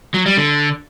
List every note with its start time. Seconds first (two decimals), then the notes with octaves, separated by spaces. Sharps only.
0.14 F#3
0.26 G3
0.37 D3